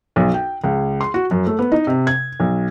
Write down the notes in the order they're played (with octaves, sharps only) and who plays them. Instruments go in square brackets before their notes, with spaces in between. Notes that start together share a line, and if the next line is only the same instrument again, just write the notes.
[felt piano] B1
G5
C#2
C6
F#4
F#2
A3
B3
D#4
C3
G#6
B1